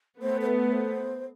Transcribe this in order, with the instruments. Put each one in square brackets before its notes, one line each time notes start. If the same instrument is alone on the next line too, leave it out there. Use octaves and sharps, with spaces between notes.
[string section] A3 B3 [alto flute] C5
[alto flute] C5
B4
C5